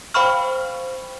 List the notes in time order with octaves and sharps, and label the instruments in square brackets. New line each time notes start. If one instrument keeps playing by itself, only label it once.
[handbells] C5 F5 G5 B5 C#6 F6